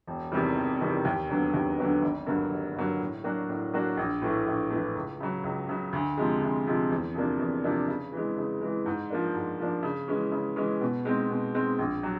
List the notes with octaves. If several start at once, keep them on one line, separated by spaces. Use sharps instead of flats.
E1
E2 C3 D#3 G3
E1
E2 C3 D#3 G3
D#2
D3 F#3 B3
D#2
D3 F#3 B3
G#1
G2 D3 F#3 A#3
G#1
G2 D3 F#3 A#3
A2
F#3 A#3 D4 F#4
A2
F#3 A#3 D4 F#4
A#1
A2 E3 A3
A#1
A2 E3 A3
C#2
C#3 F#3
C#2
C#3 F#3
D2
C3 F3 G#3
D2
C3 F3 G#3
E2
C3 F3 A#3 D4
E2
C3 F3 A#3 D4
C#3
E3 G#3
C#3
E3 G#3
G#2
F3 A#3 D4
G#2
F3 A#3 D4
C#3
E3 G#3 C#4
C#3
E3 G#3 C#4
B2
G#3 C4 D#4
B2
G#3 C4 D#4
A#1
F#3